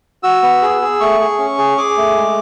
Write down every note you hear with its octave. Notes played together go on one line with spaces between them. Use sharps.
F#4 E6
B3
G#4
G#4
A3 C#6
G#4
C#4
G#4
G#4 D6
A3
G#3